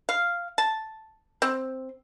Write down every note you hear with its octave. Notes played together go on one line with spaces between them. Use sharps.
F5
A5
C4